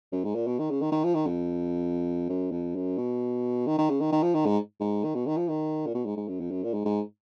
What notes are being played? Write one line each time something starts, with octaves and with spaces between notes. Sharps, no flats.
F#2
G#2
A#2
B2
D#3
C#3
D#3
D#3
F3
D#3
F2
F#2
F2
F#2
B2
D#3
D#3
C#3
D#3
D#3
F3
D#3
G#2
G#2
D#3
B2
D#3
F3
D#3
A#2
B2
G#2
G#2
F#2
F2
F#2
A#2
G#2
G#2